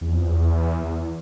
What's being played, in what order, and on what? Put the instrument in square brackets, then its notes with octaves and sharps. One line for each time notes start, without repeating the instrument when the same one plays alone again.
[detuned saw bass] E2
F2
E2
E2